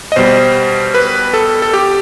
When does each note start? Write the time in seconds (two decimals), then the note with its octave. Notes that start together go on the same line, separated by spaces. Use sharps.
0.12 D#5
0.16 B2 G3 C5
0.94 B4
1.33 A4
1.62 A4
1.73 G4